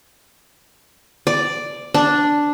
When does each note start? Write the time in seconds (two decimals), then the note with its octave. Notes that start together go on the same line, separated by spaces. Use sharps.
1.27 D5
1.94 D4